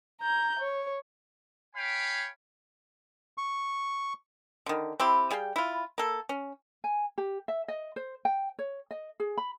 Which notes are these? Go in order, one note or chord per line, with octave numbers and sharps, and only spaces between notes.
A#5 G6
C#5
C#5 F5 G5 G#5 B5
C#6
D3 D#3
C4 E4 G4
G3 G#4 F5 G5
E4 F4
A#3 A4
C#4
G#5
G4
E5
D#5
C5
G5
C#5
D#5
G#4
B5